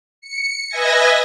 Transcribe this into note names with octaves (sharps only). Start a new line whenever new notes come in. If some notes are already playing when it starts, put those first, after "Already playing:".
C#7
B4 D#5 E5 G#5 G#6 A#6